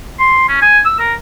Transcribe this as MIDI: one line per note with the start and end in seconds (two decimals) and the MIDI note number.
0.19 0.47 84
0.49 0.57 61
0.62 0.79 80
0.85 0.99 88
0.99 1.14 70